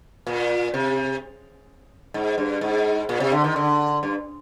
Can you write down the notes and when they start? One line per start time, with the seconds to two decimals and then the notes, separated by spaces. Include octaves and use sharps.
0.27 A#2
0.74 C3
2.14 G#2
2.38 G2
2.61 G#2
3.09 A#2
3.20 C3
3.32 D3
3.44 D#3
3.56 D3
4.03 G2